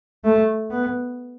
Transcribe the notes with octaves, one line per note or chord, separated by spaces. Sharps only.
A3
B3